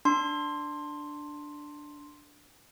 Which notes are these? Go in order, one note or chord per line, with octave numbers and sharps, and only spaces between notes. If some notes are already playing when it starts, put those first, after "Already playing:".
D4 C6